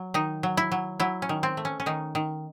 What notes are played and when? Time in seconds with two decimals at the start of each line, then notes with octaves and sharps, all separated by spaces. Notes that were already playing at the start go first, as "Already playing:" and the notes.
Already playing: F#3
0.14 D#3 D#4
0.43 F#3
0.57 E4
0.72 F#3
1.00 F#3 E4
1.22 C#4
1.29 D#3
1.43 C4
1.57 A3
1.65 C#4
1.80 C#4
1.86 D#3 D#4
2.15 D#3